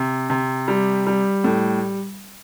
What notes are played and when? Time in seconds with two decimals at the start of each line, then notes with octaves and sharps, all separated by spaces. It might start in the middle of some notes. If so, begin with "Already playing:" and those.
Already playing: C3
0.30 C3
0.68 G3
1.07 G3
1.44 A2